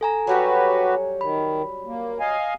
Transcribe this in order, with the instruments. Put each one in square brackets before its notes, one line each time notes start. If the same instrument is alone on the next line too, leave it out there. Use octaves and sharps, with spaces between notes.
[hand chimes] A4 G#5 A#5
[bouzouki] F#3 G3 C#4 [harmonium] F#4 G4 B4
[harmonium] D#3 [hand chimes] B5
[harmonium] A#3
D#5 F5 G#5